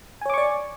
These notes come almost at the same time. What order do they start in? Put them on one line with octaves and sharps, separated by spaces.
G#5 C#5 D6 C#6 D5